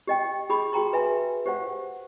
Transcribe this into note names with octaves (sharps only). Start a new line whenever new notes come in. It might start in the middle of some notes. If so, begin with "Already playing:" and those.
G4 D#5 G5
G4 G#4 B5 D6
F#4 G#4 G5 A#5 C6
B4 E5 G#5
G4 C5 F5 F#5